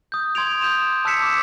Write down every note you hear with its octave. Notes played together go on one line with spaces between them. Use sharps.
D#6 G6
C6 G#6 D7 F7
D#6 G6 D#7 E7
D6
A5 E6 F#6 B6 C#7 E7
D6